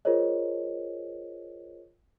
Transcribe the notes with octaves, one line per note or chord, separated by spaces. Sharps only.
F4 G#4 A#4 C5 C#5 D#5